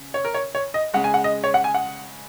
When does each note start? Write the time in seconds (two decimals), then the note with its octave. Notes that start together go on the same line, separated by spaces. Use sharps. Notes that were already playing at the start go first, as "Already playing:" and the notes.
Already playing: C#3
0.14 C#5
0.25 A#4
0.34 C#5
0.55 C#5
0.74 D#5
0.94 C#3 G#3 F#5
1.04 G#5
1.14 F#5
1.24 D#5
1.44 C#5
1.54 F#5
1.64 G#5
1.74 F#5